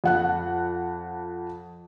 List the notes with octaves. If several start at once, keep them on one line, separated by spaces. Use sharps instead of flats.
F2 F#5 F#6